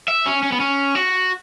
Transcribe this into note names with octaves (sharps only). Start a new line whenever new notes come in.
E5
C#4
C#4
B3
C#4
F#4